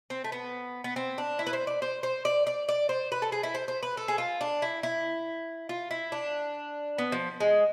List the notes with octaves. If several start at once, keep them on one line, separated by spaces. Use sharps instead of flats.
C4
A3
B3
B3
C4
D4
E4
B4
C5
D5
C5
C5
D5
D5
D5
C5
B4
A4
G#4
E4
C5
C5
B4
A4
G#4
F4
D4
E4
E4
F4
E4
D4
B3
F3
G#3